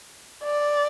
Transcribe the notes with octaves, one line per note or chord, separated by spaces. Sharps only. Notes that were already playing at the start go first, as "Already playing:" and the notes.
D5